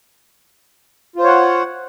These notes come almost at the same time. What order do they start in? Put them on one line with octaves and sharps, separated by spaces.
F4 C5 C#5 F#5